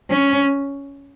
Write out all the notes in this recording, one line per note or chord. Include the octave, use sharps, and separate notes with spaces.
C#4